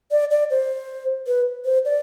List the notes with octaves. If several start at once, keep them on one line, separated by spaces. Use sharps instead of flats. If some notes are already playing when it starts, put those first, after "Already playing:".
D5
D5
C5
B4
C5
D5